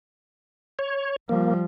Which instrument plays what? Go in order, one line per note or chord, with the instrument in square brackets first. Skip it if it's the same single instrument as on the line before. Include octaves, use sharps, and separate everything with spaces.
[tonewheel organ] C#5
[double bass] F3 G3 [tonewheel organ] A#3